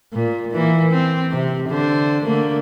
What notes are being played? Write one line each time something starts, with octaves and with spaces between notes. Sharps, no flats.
A#2
E3 A#3
C4
C3
D3 C5
D3 A3 A#3